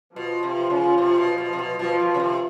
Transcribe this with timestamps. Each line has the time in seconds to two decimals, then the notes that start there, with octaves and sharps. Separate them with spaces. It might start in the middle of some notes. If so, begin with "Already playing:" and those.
0.16 B2 F3
0.43 C3
0.70 C#3
0.98 C3
1.18 B2
1.38 B2
1.53 C3
1.59 B2
1.79 B2 F3
2.00 B2
2.14 C#3
2.19 C3